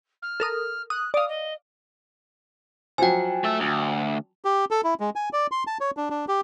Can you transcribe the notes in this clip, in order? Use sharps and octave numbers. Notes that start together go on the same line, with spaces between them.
F6
A4 A#4 D#6
D#6 F#6
D5 F5 D#6
D#5
F3 F#3 G5 G#5
A3 E5
D2
G4
A4
E4
G#3
G#5
D5
C6
A5
C#5
D4
D4
G4